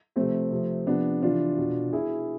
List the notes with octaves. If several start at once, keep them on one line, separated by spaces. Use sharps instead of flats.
C3 F3 A3 C4
C3 F3
C3 F3 B3 D4
C3 E3 D4 F4
B2
B2 E4 G#4